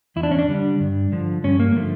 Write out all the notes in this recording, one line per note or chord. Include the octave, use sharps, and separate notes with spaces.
E2 E4
D4
C#4
D4
D3 G3
G2
D3 F3
G2 C#4
A#3
D3 F3 A3